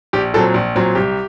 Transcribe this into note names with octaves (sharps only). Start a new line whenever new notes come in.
A#1 G4
A#2 F#3 C4 A4
A#1
A#2 F#3 C4
C2 G4